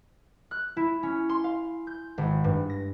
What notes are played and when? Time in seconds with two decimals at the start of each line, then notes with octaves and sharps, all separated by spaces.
0.51 F#6
0.77 E4
1.03 C#4
1.29 C6
1.44 F5
1.87 G6
2.18 G#1
2.44 G2
2.70 A#6